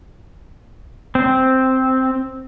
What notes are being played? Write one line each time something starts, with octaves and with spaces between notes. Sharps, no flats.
C4